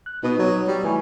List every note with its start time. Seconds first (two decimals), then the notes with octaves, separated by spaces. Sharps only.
0.06 F#6
0.23 B2 D#4 B4 D#6
0.39 F#3
0.67 G3
0.83 E3 A3 G#5 C#6